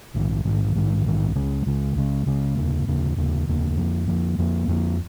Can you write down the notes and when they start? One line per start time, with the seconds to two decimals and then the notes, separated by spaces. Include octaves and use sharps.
0.14 A#1 G#2 D#3
0.44 A#1 G#2 D#3
0.75 A#1 G#2 D#3
1.05 A#1 G#2 D#3
1.35 C#2 C#3 G#3
1.66 C#2 C#3 G#3
1.95 C#2 C#3 G#3
2.26 C#2 C#3 G#3
2.56 F1 D#2 C#3 A#3
2.86 F1 D#2 C#3 A#3
3.16 F1 D#2 C#3 A#3
3.47 F1 D#2 C#3 A#3
3.77 F2 F3 A#3
4.08 F2 F3 A#3
4.38 F2 F3 A#3
4.68 F2 F3 A#3